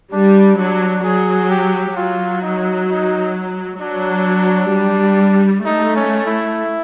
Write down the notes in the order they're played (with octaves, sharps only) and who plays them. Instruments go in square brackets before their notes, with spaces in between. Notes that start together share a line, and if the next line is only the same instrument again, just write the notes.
[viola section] G3 [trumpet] D4
[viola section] F#3 [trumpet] D4
[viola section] F#3 [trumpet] G#4
[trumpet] G4
[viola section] F#3 [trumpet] F4
[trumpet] D#4
D#4
[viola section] F#3 [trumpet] D4
[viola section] G3
[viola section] A3 [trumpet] D#4
[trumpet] C#4
E4